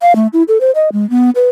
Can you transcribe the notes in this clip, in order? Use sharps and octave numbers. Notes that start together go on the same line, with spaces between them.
F5
A3
E4
A4
C5
D#5
G#3
B3
B4